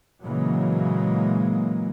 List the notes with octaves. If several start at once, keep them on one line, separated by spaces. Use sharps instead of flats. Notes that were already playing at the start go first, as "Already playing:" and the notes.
A#2 C#3 E3 F#3 G#3 A#3